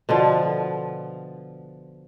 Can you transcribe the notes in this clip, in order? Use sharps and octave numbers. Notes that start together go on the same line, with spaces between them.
B2 D3 F3